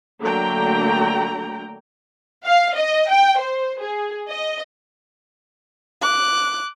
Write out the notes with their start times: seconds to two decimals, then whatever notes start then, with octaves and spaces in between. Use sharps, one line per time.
0.21 D3 F#3 A3 A#3 G5 A#5
2.45 F5
2.74 D#5
3.09 G5
3.39 C5
3.80 G#4
4.28 D#5
6.02 D6 F#6